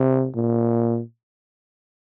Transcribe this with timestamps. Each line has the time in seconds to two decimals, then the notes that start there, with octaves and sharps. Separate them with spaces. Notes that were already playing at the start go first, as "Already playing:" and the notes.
Already playing: C3
0.35 A#2